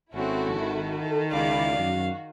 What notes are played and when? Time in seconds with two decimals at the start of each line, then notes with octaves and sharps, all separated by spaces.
0.13 G#1 C4 C#4 E4 F#4 A4
0.53 D#3
1.00 A4
1.33 C#2 E4 G#4 D5 F5
1.79 F#2 F#4